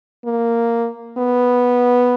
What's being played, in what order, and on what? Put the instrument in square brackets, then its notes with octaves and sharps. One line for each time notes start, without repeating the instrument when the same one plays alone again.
[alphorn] A#3
B3